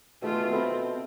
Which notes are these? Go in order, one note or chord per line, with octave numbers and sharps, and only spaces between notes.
B2 A3 F4 F#4 G#4 E5
C4 A4 E5 B5